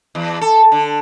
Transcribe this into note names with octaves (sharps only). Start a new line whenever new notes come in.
E2
A4
D3